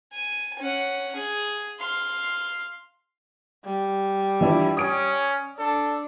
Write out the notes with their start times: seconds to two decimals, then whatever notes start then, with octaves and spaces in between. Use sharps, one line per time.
0.13 G#5
0.59 C#4 F#5
1.16 G#4
1.80 F5 C6
3.65 G3
4.41 E3 D4 E4 F4
4.77 C#4 D#6 G#6 D7
5.59 D4 A4